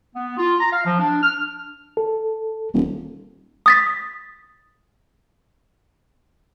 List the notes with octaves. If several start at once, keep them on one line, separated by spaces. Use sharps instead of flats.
B3
F4
A#5
F5
F3
D4
F6
A4
D#1
D#6 A6 B6